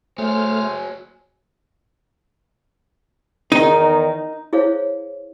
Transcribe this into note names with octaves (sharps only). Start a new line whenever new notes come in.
A3 F#4 G#4 C5 C#5 G#5 F6
E2 D#3 D#4
E4 G#4 C5 C#5 F5